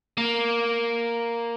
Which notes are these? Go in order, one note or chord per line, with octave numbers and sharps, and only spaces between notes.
A#3